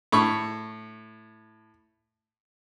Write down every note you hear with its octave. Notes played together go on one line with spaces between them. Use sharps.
A2 B5 C#6